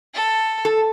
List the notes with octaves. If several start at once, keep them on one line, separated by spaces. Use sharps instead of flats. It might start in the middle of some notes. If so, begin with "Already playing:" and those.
A4
A4